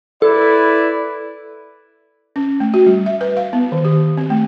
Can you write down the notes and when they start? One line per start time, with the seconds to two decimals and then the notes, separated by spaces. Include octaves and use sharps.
0.22 E4 A4 B4 D5
2.36 C#4
2.60 A3
2.74 F#4
2.86 G3
3.06 E5
3.21 B4
3.37 F5
3.53 B3
3.72 D#3
3.85 G4
4.17 C4
4.30 A3